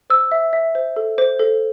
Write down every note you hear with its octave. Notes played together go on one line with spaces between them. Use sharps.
C5 E6
E5
E5
C5
A4
C5
A4